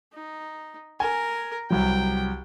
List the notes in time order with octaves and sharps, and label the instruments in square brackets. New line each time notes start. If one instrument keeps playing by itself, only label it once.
[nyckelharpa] D#4
[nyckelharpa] A#4 [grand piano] G#5
[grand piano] C2 F#3 [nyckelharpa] G5